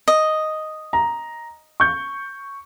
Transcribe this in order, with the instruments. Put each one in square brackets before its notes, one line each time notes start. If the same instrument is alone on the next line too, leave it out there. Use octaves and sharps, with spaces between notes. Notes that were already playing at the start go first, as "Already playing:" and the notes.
[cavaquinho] D#5
[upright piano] A#5
C#6 G6